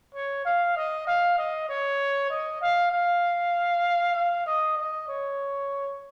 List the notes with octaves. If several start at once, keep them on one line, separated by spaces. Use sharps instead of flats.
C#5
F5
D#5
F5
D#5
C#5
D#5
F5
F5
F5
D#5
D#5
C#5